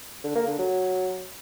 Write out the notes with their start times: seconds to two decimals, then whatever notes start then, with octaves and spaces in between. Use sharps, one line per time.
0.24 D3
0.36 A#3
0.47 D3
0.59 F#3